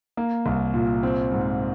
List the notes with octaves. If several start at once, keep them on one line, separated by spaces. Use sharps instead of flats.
A#3
C2
A#2
C4
G#2